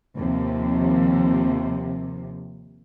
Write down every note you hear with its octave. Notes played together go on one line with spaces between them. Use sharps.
D#2 C3 F3